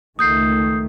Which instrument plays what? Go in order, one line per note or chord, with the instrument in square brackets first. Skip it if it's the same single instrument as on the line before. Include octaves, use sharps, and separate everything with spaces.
[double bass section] C#2 D#3 A3 [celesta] D#6 G6 C7